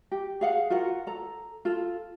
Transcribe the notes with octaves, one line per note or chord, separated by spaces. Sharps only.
G4
G#4 F5 F#5
F4 F#4 A#4 F#5
A4 A#5
F4 A4